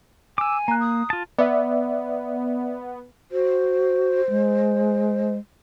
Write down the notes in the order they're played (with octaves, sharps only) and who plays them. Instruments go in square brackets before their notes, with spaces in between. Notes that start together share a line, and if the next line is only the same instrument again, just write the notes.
[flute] G#5 [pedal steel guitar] D6 E6
[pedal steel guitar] A#3 [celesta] A#5 F#6
[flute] D#6
[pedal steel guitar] F4 A5
[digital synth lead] B3 [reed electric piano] D5 E5
[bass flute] F#4 [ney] C5
[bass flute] G#3